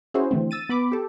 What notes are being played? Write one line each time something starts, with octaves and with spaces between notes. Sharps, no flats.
C#4 E4 F#4 G#4 C5
D3 E3 A3 C4
E6 A6 D#7
B3 B5 D6
G4 A4